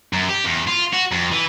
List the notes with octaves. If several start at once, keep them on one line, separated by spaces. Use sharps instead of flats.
F#2
G4
E2
F4
F#4
F2
E3